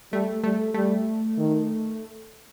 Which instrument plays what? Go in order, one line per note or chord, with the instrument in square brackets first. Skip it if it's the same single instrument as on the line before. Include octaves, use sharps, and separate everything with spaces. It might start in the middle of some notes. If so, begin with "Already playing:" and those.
[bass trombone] G3 [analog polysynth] A3
[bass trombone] G3 [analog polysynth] A3
[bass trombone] G3 [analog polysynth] A3
[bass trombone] D#3